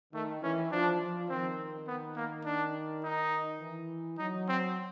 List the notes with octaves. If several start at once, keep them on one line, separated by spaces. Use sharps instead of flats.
D#3 A3
E3 C#4
F3 D4
F3
D#3 C4
B3
A#3
D4
D#4
E3
F#3 D#4
C4